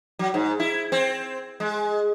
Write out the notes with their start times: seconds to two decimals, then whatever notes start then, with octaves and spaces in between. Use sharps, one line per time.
0.19 F#3
0.34 G#2
0.60 E4
0.92 C4
1.60 G#3